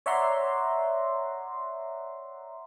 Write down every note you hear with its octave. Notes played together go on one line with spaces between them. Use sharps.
C#5 D5 E5 F#5 A#5 C6